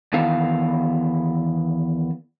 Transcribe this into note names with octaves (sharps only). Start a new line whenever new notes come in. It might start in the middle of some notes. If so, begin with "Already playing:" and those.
E2 D#3 B3 E4 A4 F5